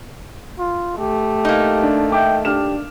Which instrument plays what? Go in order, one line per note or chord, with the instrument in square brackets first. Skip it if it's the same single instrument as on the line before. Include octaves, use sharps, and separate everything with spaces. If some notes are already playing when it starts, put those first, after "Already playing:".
[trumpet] F4
[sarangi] A3 [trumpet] G4
[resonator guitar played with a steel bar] A#3 D#4
[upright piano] D4
[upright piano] D#5 E5 D6 [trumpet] G5
[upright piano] D4 F6 E7 [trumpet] G4